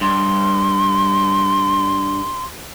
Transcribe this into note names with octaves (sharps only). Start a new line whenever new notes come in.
G2 C6